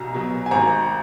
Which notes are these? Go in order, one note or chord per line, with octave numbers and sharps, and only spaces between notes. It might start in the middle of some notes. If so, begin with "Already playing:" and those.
Already playing: B1 B2 F#3 A#5
B2 F#3
G#5
G#1 A#5